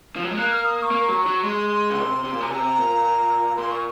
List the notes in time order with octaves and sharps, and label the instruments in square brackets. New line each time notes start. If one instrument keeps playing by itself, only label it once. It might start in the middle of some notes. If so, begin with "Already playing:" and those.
[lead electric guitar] F3
F#3
G#3
[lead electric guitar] A#3 [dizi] F#6
[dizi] F6
D#6
D#6
C#6
[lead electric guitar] A#3
F#3
F#3
[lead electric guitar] G#3 [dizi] C6
[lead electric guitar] C#3
C3
C3
A#2
C3
[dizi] G#5
[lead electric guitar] C3 [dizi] A#5
[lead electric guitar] A#2
[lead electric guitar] A#2 [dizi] C6
[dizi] C#6